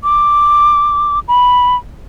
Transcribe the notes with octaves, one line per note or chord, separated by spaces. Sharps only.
D6
B5